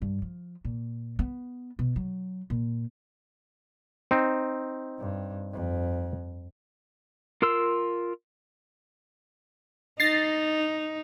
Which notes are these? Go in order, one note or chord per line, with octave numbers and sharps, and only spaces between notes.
G2
F3
A#2
B3
B2
F#3
A#2
C4 D#4
G2
F2
F4 A#4 C6 E6
D#4 A6 A#6 C7